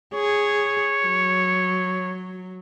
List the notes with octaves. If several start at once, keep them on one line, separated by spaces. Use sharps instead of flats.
G#4 C#5
F#3